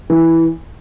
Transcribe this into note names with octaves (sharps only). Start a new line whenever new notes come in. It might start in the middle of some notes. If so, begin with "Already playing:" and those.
E3